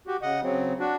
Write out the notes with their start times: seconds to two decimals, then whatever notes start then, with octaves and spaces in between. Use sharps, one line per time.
0.07 F#4 G4
0.22 C#3 D#5 F#5
0.43 C#3 F#3 C4
0.80 D4 F#4